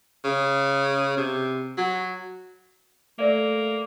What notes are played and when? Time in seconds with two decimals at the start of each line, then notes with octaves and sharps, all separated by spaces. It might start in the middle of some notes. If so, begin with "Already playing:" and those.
0.24 C#3
1.17 C3
1.77 F#3
3.19 A3 A#3 A#4 D5 E5